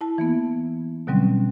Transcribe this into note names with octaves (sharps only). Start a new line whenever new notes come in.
E4 A5
E3 A#3 B3
B2 D3 F#3 G3 C4 C#4